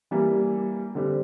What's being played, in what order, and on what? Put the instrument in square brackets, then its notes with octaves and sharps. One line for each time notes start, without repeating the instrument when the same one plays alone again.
[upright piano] E3 G3 A#3
D3 G3 C4